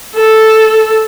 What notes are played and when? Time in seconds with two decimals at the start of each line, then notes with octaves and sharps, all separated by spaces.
0.15 A4